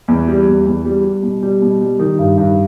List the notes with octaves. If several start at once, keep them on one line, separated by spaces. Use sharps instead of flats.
E2
G3
E2
E2
G3
G3
B2
G3
B2
G3
D#3
G2
G2